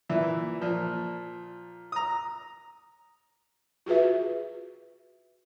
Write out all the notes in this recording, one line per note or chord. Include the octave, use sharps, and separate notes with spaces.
A#2 E3 E5
A#2 F3
A#5 D#6
F4 F#4 G#4 B4 E5